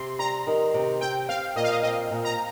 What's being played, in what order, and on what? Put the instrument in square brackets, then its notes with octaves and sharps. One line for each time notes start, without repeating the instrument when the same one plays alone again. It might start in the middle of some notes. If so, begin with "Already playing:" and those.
Already playing: [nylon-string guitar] C3 [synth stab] C6
[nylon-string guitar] G3 [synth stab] A#5
[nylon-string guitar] D#3
C3
[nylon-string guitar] C4 [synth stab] G5
[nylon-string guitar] C4 [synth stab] F5
[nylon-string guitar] A#2 [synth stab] D#5
[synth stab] F5
D#5
[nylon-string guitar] C4 [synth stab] D#5
[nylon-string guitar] A#2
[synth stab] A#5